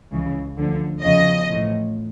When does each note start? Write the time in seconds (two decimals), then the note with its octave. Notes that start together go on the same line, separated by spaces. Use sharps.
0.12 C#2 C#3 E3
0.58 D2 D3 F3
1.03 E2 C#3 F3 D#5
1.48 A1 A2 F3